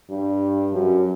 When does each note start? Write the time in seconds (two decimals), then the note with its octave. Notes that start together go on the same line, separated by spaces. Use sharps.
0.10 G2
0.73 F#2